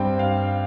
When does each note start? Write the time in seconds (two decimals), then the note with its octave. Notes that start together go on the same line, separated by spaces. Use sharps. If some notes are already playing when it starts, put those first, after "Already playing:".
Already playing: G2 G3 C4 G5
0.19 F5